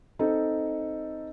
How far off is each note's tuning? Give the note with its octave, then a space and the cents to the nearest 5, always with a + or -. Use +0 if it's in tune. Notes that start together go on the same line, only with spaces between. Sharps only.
C4 +0 D#4 +5 A4 +0